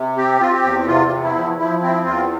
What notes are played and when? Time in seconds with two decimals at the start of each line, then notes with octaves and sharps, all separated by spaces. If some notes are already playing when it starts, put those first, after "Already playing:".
Already playing: C3
0.17 C4 G4
0.41 C4 F4
0.52 G4
0.63 E2
0.87 C3 F4
1.11 E2
1.23 E4
1.35 F3
1.58 F3 E4
1.82 C4 E4
2.05 E2 F4